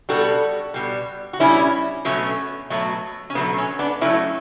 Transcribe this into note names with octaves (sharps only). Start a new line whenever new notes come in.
B2 G3 F#4 A4
B2 G3
F#4
B2 G3 C#4 E4
B2 F#3 A3 C#4
B2 F#3 A3
C#4
B2 F#3 A3 B3
C#4
B3 D4
B2 F#3 A3 C#4 E4